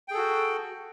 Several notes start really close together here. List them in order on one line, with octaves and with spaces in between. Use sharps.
G5 G#4 A4 F#4